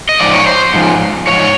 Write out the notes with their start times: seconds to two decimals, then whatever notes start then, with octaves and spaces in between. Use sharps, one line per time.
0.09 D#5
0.20 G#2 F3 D5
0.33 C#5
0.47 C5
0.74 G#2 F3
1.27 F3 C#5
1.31 G#2